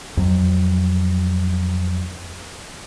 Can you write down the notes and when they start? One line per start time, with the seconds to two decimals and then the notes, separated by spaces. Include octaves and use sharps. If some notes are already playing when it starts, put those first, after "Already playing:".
0.17 F2 F#3